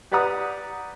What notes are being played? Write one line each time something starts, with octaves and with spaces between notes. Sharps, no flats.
G4 B4 D5 F#5 A#5 D#6